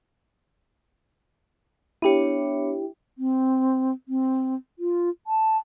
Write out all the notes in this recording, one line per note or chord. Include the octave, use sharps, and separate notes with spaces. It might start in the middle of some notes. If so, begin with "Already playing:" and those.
B3 D4 E4 G4 C#5
C4
C4
F4
A5